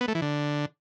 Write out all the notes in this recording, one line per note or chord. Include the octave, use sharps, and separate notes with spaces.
B3
A3
E3
D3